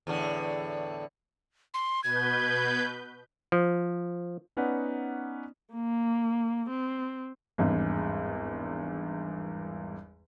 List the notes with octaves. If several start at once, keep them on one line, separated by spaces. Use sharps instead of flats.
E2 A2 D3
C6
B2 B4 G6 G#6
F3
B3 C#4 D#4 B4 D5 F#5
A#3
C4
G#1 E2 G2